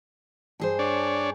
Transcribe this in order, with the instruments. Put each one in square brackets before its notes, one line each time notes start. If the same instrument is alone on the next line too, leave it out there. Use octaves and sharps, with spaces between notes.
[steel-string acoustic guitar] G2 G#4 C5
[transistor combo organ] D4 C#5 D5